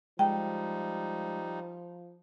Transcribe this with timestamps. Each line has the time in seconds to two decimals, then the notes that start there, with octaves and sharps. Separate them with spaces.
0.19 F3 G3 G#3 D#4 G5